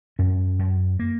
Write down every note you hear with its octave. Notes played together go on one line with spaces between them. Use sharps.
F#2 C#4
F#2
A#3